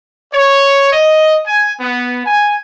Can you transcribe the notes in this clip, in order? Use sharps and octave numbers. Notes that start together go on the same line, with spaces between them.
C#5
D#5
G#5
B3
G#5